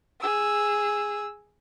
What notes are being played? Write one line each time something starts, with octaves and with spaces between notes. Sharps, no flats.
G#4 E6